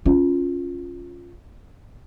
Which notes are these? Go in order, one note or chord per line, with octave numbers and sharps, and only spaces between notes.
C#4 F4